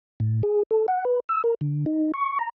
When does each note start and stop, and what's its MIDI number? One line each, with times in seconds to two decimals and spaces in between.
0.20 0.42 45
0.43 0.63 68
0.71 0.86 69
0.88 1.05 78
1.05 1.20 71
1.29 1.42 88
1.44 1.54 70
1.61 1.85 50
1.86 2.12 63
2.14 2.38 85
2.39 2.49 82